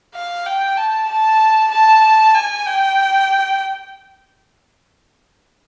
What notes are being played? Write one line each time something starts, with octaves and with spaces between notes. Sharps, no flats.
F5
G5
A5
A5
A5
G#5
G5